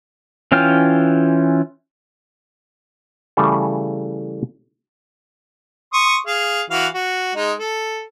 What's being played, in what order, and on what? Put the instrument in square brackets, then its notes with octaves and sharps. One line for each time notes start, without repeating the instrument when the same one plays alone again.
[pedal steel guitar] E3 C#4 F4 G5 F6
[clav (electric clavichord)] C#3 E3 G3 A3 A4
[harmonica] C6 C#6 D#6
G#4 F5
E3 F#4 F5
F#4
G#3 D#4
A4